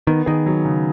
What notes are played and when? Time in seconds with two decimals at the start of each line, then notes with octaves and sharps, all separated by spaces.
0.07 D#3 B3
0.26 D#3 G#4
0.46 F#3
0.65 C#3